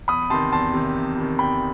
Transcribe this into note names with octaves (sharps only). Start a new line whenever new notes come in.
E2 B5 D#6
C3 D#3 A5 C6
E2 A5 C6
C3 D#3
E2
C3 D#3
E2 G5 B5